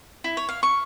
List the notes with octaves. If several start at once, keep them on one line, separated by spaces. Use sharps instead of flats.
E4
C#5
F5
C#6